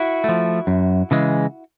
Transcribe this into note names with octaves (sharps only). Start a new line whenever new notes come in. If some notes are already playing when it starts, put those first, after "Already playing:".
Already playing: E4 F#4
F3 A3
F#2
C#3 E3 G#3